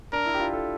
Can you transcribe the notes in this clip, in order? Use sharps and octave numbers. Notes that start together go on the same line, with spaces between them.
D4 A#4
E4
G4
F4
A4